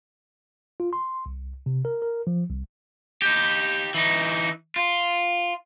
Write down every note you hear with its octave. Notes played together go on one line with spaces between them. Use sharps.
F4
C6
C2
C3
A#4
A#4
F3
C2
D#4 G4
E3 D#4
F4